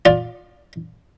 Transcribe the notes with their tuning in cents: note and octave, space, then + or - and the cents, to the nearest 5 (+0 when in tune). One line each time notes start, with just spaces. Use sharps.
F4 +20 D5 +0